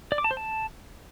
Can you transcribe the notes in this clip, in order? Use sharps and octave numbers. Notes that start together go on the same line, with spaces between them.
D5
D6
A5
C5
A5